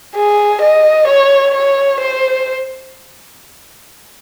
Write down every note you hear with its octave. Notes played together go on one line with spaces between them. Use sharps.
G#4
D#5
C#5
C#5
C5